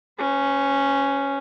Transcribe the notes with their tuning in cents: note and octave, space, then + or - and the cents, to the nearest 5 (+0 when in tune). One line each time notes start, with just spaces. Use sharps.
C#4 +0 B4 +45